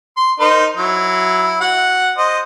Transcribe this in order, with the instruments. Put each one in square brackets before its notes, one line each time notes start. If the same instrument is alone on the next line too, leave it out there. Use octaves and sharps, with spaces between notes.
[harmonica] C6
D#4 A#4 C5
F#3 E4
F#4 F#5
C5 D#5